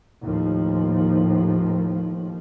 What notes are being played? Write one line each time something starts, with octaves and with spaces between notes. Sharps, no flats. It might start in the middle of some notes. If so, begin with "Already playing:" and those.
D#2 A2 F3